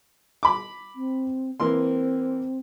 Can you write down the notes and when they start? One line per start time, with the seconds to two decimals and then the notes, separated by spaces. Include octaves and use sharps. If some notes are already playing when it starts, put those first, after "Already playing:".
0.43 B5 D6
0.95 C4
1.60 E3 A#3 C4 C6